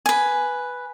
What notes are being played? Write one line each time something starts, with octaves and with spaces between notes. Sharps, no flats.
B4 G#5